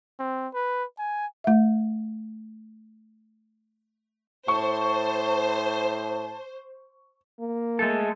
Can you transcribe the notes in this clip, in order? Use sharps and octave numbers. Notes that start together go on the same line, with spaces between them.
C4
B4
G#5
A3 E5
A2 C5 A5 C#6
A#3
G#3 A3 A4